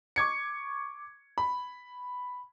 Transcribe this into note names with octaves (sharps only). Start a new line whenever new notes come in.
C#6 D6 G#6 C#7
B5